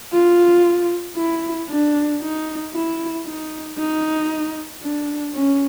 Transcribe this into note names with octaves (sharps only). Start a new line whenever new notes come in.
F4
E4
D4
D#4
E4
D#4
D#4
D4
C#4